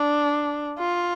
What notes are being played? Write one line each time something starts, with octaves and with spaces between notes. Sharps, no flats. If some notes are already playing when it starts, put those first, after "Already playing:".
Already playing: D4
F4